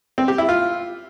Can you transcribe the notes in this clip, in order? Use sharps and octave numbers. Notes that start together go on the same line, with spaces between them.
C4
G4
E4
F4